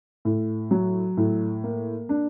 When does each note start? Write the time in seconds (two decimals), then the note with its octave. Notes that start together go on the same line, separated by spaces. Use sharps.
0.25 A2
0.71 F#3
1.17 A2
1.63 A#3
2.09 D4